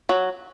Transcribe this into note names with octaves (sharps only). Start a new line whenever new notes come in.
F#3